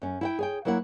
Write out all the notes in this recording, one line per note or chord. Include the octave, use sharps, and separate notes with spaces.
F#2 C#4
E4 F#5 G5
G#4 C#5 G5
F#3 A#3 E4 C#5 F#5